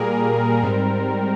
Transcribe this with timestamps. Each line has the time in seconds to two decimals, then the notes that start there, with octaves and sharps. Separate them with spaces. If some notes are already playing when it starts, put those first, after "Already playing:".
Already playing: A#2 G3 A#3 G#4 A#4
0.63 G#2 G3 C4 A#4